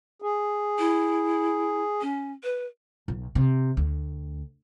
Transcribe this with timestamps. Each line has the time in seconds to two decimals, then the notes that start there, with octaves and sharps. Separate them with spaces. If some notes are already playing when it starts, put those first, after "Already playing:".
0.22 G#4
0.79 E4
2.01 C#4
2.44 B4
3.08 B1
3.35 C3
3.77 D2